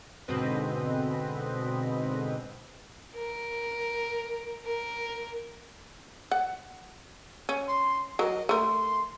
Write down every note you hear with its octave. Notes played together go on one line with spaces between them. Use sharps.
G#2 B2 D3 C4 B4 D#5
A#4
A#4
F#5
C#4
C6
F#3 A#4 D#5
A3 A#4 C6